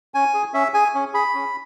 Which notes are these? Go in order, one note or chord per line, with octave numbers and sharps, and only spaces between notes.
C#4 G#5
G#4
C#4 E5
G#4 G#5
C#4
G#4 B5
C#4